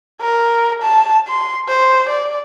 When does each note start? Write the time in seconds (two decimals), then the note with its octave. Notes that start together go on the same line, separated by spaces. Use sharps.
0.21 A#4
0.82 A5
1.28 C6
1.68 C5
2.09 D5